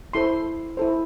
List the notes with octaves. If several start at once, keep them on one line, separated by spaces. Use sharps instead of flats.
E4 A4 C5 C6
E4 A4 C5